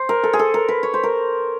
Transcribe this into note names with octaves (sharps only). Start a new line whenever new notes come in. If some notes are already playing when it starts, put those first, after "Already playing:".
Already playing: C5
A#4
A4
G#4
A4
A#4
B4
C#5
C5
A#4